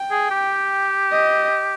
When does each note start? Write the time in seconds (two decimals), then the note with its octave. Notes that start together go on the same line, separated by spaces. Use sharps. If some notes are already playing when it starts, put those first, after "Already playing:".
Already playing: G5
0.11 G#4
0.31 G4
1.12 D#5